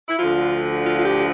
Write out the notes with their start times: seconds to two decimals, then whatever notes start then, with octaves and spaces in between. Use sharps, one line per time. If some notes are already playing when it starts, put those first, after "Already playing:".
0.09 E4
0.18 D2 D3 F3 F4
0.83 F4
0.99 F4
1.05 G4